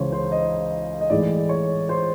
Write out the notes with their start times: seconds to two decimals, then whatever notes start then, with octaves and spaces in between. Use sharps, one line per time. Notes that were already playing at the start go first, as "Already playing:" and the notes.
Already playing: C#2 C#3 E3 C5 C#5
0.12 C5
0.32 D#5
1.01 D#5
1.10 A2 E3 G#3 D5
1.49 C#5
1.89 C5